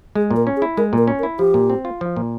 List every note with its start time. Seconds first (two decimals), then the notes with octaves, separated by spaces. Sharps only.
0.15 G#3 G#4
0.31 A#2
0.36 A#4
0.47 C#4
0.57 G#4
0.62 E4
0.77 G#3 A#4
0.93 A#2 A#4
1.08 C#4
1.19 A#4
1.23 E4
1.39 F3 G4
1.54 A#2
1.70 C4
1.85 F4
2.01 F3
2.16 A#2